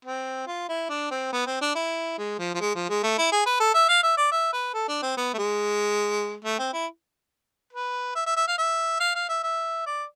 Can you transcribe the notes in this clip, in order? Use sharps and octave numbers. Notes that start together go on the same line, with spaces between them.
C4
F4
E4
D4
C4
B3
C4
D4
E4
G#3
F3
F3
G#3
F3
G#3
A3
E4
G#4
B4
A4
E5
F5
E5
D5
E5
B4
A4
D4
C4
B3
A3
G#3
A3
C4
E4
B4
E5
E5
E5
F5
E5
F5
F5
E5
E5
D5